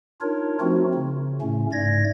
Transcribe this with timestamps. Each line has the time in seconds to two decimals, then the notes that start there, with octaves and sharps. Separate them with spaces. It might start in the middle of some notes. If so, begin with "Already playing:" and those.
0.21 D4 D#4 F4 A#4 C#5
0.61 F3 A3 C4 D#4 F4 F#4
0.94 C#3
1.42 A2 C#3 A3 C#4
1.72 G#2 A3 D5 G#6 A#6